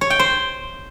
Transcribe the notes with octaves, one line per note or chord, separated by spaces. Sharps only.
C#5
G5
C5